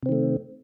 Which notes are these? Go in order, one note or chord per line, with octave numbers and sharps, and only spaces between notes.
C3 D#3 A3 C4